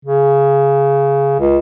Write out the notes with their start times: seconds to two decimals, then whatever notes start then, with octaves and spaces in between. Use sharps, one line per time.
0.05 C#3
1.39 C#2